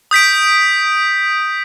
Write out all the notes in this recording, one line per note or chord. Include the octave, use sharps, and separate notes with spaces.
D#6 G6 B6 D7